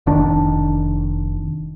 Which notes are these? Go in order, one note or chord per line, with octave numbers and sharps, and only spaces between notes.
F1 D#3 D4